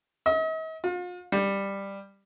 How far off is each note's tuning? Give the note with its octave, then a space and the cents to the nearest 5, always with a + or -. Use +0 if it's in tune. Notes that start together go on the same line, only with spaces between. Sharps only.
D#5 +45
F4 +40
G3 +10